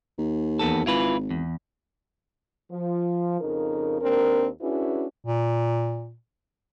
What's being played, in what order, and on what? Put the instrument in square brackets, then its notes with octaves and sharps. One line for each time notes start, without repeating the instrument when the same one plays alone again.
[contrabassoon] D#2
[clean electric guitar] E2 B3 A4
[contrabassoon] G#1 [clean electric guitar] E4 F4 B4
[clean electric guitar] E2
[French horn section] F3
F2 C#3 D#4 A#4
D#2 C4 D4 A#4
C#4 D4 E4 F#4 G#4 B4
[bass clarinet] A#2